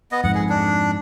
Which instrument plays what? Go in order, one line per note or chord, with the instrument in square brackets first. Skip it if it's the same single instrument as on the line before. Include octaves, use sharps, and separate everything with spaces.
[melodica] B3 D#5
[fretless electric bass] F2 G#2 [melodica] F#5
[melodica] G#4
D4